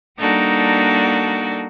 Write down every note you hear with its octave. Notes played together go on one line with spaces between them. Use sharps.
G3 A#3 D4 D#4 F#4 A4